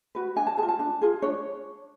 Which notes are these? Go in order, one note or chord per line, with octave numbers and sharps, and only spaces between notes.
F#4 B4
D4 G#5
A5
G#4 A5
F4
A5
D4
F4 G#4
D4 C#5